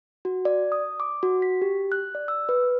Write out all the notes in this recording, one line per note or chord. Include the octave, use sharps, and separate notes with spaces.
F#4
D5
D#6
D6
F#4
B6
G4
F#6
D5
E6
B4